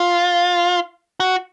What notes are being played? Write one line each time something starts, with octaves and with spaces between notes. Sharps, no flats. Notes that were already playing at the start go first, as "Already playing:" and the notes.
Already playing: F4
F#4